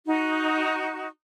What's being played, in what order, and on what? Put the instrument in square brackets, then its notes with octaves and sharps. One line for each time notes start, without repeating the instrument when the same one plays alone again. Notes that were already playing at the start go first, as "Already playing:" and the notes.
[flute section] D#4 F#4